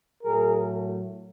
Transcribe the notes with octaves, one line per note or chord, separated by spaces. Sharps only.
A2 F#3 A3 G#4 A#4